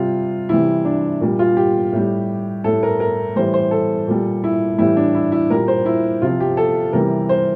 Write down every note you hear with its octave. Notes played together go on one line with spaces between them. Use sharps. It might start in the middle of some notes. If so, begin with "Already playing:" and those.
Already playing: C3 G3 F4
C3 E3 G3 E4
D4
A#2 G3
F4
G4
A2 G3
A2 G3 A4
A#4
A#4
A2 E3 G3 C5
C5
A4
A#2 G3
E4
A2 E3 G3 E4
D4
E4
E4
A#2 G3 A#4
C5
E4
C3 F3 F4
G4
A4
C3 E3 G3 A#4
C5